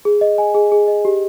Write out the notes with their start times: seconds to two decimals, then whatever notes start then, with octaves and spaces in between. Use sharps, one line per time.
0.05 G#4
0.21 D#5
0.38 G#5
0.55 G#4
0.72 G#4
0.88 D#5
1.05 G4